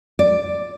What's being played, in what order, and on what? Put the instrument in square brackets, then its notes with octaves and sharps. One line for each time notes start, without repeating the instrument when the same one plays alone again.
[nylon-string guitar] D5